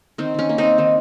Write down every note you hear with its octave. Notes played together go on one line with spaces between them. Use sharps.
D#3 C4
D#3 C#4
A#3
C4 D#4
A#3
D#3